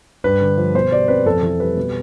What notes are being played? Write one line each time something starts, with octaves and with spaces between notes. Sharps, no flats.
G2 B4
D3
F3
B2 C5
G3 D5
C4 B4
F2 A4
E3 A4
G3 B4
B2